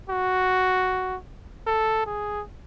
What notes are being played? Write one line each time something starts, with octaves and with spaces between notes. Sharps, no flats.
F#4
A4
G#4